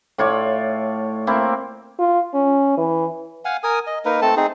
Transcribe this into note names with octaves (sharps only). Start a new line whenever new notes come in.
A2 F4 C#5 D5
A#3 C4 E4
F4
C#4
E3
F5 F#5 G#5
A#4 G#5 D#6
D#5
A#3 D#4 A#4 B4
A3 C4 A4 A5
C4 D#4 G#4